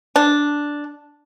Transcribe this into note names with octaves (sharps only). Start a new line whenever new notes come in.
D4